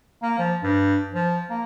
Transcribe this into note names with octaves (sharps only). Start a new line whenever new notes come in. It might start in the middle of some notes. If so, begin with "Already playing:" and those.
A#3
F3
G2
F3
A#3